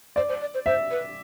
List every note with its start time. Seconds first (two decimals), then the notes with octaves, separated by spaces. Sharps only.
0.16 C5 D5
0.29 C5
0.41 D5
0.54 C5
0.66 C5 E5
0.91 B4